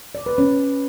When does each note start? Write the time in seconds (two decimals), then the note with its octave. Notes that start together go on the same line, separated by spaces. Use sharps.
0.15 D5
0.26 B4
0.38 C#4